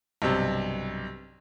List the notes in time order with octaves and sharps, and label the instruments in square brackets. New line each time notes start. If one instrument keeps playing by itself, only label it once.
[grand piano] B1 G2 C3